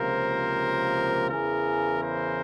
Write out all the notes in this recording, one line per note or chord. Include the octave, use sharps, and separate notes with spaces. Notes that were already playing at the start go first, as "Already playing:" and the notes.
Already playing: C#2 C3 F3 A#3 A#4 C5
E2 C#3 E3 G#4 A#4
A#4 C5